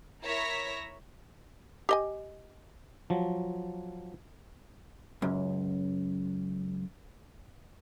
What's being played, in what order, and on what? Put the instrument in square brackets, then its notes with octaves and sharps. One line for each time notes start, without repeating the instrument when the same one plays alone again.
[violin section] E4 A#4 C#5 E5 A#6 B6
[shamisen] G4 D#5 G#5
[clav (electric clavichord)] F3 F#3
[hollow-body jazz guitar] C#2 F#2